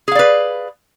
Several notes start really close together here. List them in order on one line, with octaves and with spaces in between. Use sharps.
G#4 F5 D5 B4